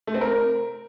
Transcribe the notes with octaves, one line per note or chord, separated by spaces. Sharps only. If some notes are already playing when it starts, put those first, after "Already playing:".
A3
C4
A#4